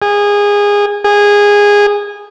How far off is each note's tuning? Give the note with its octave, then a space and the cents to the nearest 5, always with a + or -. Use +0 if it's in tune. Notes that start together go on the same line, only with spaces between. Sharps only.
G#4 -20
G#4 -15